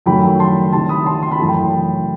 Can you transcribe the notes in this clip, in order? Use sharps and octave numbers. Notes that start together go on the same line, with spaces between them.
F#2 D#3 F#3 A3 G5 B5
A5 C6
C2 C3 D#3 A5 C6
B5 D#6
A5 C6
C6
B5
F#2 E3 A3 A5
G5 B5